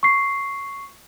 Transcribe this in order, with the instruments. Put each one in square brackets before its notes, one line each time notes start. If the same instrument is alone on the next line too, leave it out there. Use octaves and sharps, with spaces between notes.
[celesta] C#6 C7